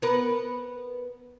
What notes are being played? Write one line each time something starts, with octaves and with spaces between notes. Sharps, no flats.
B3 A#4 B4